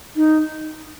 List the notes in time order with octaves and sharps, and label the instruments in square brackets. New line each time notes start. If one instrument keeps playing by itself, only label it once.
[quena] D#4